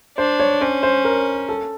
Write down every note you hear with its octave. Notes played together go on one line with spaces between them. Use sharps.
D4 C5
C#5
C#4 C5
C5
A#4
A4